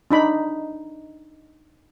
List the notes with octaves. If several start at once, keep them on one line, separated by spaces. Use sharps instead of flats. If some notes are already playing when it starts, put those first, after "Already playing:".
D4 D#4 B5